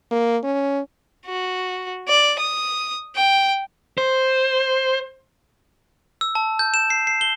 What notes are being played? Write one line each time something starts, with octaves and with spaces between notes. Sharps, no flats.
A#3
C#4
F#4
D5
D#6
G5
C5
E6
A5
G6
E7
C7
C7
G7